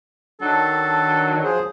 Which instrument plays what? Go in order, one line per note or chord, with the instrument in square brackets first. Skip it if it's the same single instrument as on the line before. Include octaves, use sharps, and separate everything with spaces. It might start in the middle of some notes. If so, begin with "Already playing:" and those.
[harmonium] D#3 D4 [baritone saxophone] F#3 [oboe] A4
[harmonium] F3 G#4 C5